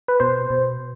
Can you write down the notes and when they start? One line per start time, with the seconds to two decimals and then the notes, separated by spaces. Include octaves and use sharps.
0.08 B4
0.20 B2 C5
0.50 B2